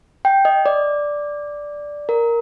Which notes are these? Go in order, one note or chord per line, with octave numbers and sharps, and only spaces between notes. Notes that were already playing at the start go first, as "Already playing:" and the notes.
G5
D#5
D5
A#4